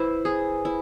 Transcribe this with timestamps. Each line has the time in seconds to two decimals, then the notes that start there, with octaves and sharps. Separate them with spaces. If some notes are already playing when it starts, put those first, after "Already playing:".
Already playing: E4 B4 C5
0.25 G#4
0.65 E4